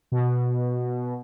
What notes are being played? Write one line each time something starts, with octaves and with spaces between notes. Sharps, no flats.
B2